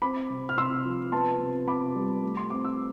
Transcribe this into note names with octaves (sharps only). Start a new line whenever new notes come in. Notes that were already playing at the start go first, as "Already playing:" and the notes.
C4 B5 D6
C3
F6
C3 C6 E6
F3
B3 A5 C6
C3
C3 B5 D6
G3
A3
C6
C4 D6
E6